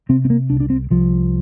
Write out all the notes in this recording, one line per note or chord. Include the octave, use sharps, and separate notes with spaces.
C3 C4
C4
A#3
C2 D4
D4
C4
C2 F3